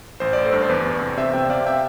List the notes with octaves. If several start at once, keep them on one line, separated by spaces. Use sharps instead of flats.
A1 C5
A1 D5
A4 C5
G2
C5
E2 B4 D5
E2
C3
C3 C5 E5
C3 E5 G5
C3 D5 F5
E5 G5